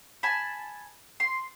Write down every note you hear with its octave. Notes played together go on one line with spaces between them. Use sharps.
G#5 A5 B5
C6